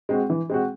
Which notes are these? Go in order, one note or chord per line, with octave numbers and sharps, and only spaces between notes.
G#3 C4 F#4
E3
G#3 C4 F#4